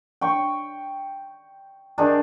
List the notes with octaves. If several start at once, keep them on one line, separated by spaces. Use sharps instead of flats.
G5 C#6
D#3 D4 D#4 G#4